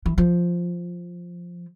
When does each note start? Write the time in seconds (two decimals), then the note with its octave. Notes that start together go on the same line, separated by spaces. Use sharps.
0.06 E3
0.18 F3